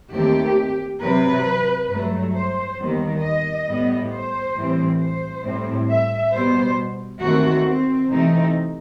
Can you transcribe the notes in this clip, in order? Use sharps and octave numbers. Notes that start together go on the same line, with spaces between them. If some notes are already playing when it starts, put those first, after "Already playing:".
D#2 D#3 A3 C4 G4
C3 F#3 C4 B4
G2 F#3 A3
C5
D#2 D#3 G3 B3
D#5
A2 G3 B3
C5
A2 E3 G3 C4
C5
A2 G3 C4
E5
B2 G3 B3 C5
D#2 D#3 A3 C4 F#4
C4
C3 E3 A3 C4 D#4